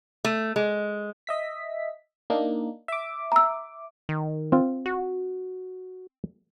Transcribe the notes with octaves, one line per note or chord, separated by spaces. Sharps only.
A3
G#3
D#5 E5 B6
A#3 D4 D#4
E5 D6
A#5 E6
D#3
C4 F4
F#4